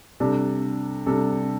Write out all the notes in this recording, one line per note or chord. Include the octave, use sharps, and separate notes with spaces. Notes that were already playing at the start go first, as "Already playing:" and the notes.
C3 G3 D4 A4
C3 G3 D4 A4